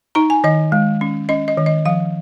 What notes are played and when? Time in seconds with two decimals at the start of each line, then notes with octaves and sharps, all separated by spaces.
0.15 D#4 A#5
0.30 G#5
0.44 D#3 D#5
0.72 G#3
1.01 C#4
1.29 C#4 D#5
1.48 D#5
1.57 D#3
1.66 D#5
1.86 F3 F5